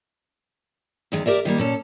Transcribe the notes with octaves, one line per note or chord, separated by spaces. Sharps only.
E2 D#3 G#3
G4 A#4 D5 E5
D#3 G3 A#3
A#2 C#4 A4